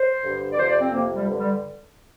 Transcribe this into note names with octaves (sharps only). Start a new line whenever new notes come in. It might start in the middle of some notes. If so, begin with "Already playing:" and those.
Already playing: C5
G2 D3
D5
F2 C3 C5
D5
C4
F2 C3 A#3
G3
G2 D3
G3